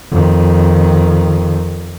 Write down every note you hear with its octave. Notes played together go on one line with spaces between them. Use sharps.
F2 D#3